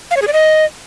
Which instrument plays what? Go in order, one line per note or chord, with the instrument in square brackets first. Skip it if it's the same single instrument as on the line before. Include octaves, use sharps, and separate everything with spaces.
[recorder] F5
C#5
G#4
D5
D#5